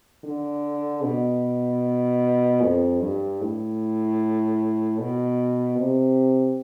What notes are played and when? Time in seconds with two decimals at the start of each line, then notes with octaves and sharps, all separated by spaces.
0.24 D3
1.03 B2
2.61 F2
3.01 G2
3.41 A2
4.99 B2
5.79 C3